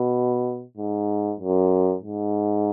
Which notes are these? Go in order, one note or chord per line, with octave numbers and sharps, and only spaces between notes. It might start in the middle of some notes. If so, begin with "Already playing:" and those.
Already playing: B2
G#2
F#2
G#2